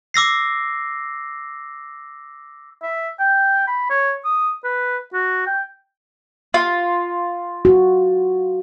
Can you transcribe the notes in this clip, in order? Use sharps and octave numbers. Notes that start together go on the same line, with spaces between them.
D6 E6 A#6 C7
E5
G5
B5
C#5
D#6
B4
F#4
G5
F4
F#4